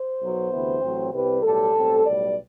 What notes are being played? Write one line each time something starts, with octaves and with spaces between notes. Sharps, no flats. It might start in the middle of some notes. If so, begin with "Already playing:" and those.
Already playing: C5
B1 B2 F#3
D2 C3 E3 B3
A1 A2 F#3 C4
C2 C3 G3 C4 B4
B1 A2 G3 A4
B1 A2 G3 C4
B1 A2 G3 D5